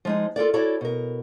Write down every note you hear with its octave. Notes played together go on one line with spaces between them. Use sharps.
F3 G#3 D#4
F4 A4 A#4 D5
E4 F#4 A4 C#5 D5
B2 A#4